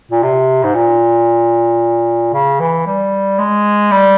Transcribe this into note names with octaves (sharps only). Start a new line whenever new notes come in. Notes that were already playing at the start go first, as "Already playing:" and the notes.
A#2
C3
G#2
A#2
C#3
E3
G3
G#3
G3